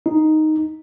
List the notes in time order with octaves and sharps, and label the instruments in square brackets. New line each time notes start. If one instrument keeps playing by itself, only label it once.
[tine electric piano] D#4